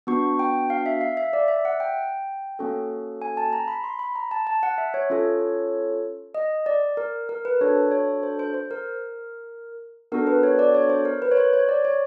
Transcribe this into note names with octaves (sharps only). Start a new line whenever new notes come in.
B3 D4 F#4 C#6
G5
F5
E5
F5
E5
D5
E5
F#5
G5
A#3 C#4 F#4 A4
G#5
A5
A#5
B5
C6
B5
A#5
A5
A5
F#5
E5
C#5
C#4 F4 A4
D#5
D5
A#4
A#4
B4
D4 F#4 A4 C#5
C#5
C5
C5
C5
A#4
B3 D4 F#4 A4 A#4
B4
C#5
D5
C#5
C5
A#4
B4
C#5
C5
C#5
D5
C#5